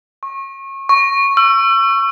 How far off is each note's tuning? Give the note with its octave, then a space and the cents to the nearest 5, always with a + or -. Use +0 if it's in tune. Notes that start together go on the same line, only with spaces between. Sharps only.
C#6 -30
C#6 -5
E6 +35